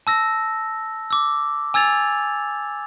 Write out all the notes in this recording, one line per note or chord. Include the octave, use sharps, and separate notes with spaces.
A5 E6 A#6
D6 E6
G#5 E6 G#6 A6 F7